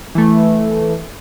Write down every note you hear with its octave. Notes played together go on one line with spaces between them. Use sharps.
E3 A3